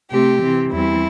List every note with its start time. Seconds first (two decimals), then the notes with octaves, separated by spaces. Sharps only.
0.11 C3 A3 C4 G4
0.41 C3 E3 C4
0.72 E2 E3 G3 C4 E4